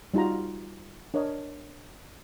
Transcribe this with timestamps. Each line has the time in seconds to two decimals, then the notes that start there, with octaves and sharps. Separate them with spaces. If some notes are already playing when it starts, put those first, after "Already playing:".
0.14 G3 D#4 F4 F#4 A#5
1.14 D4 A#4 C#5 D#5